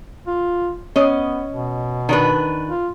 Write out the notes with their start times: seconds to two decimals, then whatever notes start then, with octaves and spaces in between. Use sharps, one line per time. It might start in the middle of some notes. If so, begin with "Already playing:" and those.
0.27 F4
0.96 B3 C#4 D#5
1.51 B2
2.09 D#3 D4 B4
2.68 F4